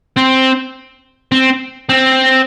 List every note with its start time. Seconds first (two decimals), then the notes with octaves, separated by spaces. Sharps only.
0.17 C4
1.32 C4
1.89 C4